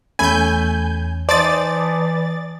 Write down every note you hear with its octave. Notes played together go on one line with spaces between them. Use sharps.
E2 A3 C#4 G#5 B5 G6
E3 D#4 C5 D5 A5 D6 D#6 A6